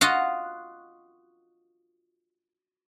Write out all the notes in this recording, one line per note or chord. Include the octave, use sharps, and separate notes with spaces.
F4 F#4 D#5 F5